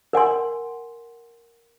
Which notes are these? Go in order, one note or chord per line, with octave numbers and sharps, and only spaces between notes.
A#4 F#5 G#5 C6